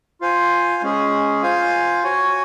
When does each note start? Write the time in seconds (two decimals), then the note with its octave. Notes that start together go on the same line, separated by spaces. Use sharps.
0.21 F4 C5 F5 G#5
0.82 G#3 C#4 G#4
1.42 F4 C5 F5 G#5
2.03 F#4 C#5 G#5